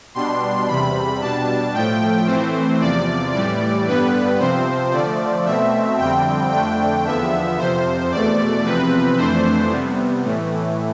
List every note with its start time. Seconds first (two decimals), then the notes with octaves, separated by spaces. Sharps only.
0.15 B2 G3 D4 C6
0.68 E2 C3 G3 B5
1.21 B2 G3 D4 A5
1.74 A2 F3 A3 G5
2.27 A2 E3 A3 C4 C5
2.80 E2 C3 F3 D5
3.34 A2 E3 G3 D5
3.86 G2 D3 G3 B3 B4
4.39 C3 F3 C4 C5
4.92 D3 F3 A3 D5
5.46 B2 A3 C4 E5
5.98 F2 D3 G3 C4 G5
6.51 F2 D3 A3 D4 G5
7.05 E2 D3 F3 B3 E5
7.58 F2 C3 F3 C5
8.11 E2 B2 A3 D5
8.64 E2 C3 F3 C4 B4
9.17 F2 E3 A3 D4 C5
9.70 C3 G3 B3
10.23 A2 E3 A3